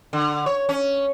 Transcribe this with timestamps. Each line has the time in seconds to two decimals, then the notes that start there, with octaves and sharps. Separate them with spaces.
0.13 D3
0.46 C#5
0.69 C#4